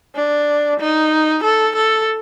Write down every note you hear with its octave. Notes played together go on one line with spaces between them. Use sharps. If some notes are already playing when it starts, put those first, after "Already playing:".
D4
D#4
A4
A4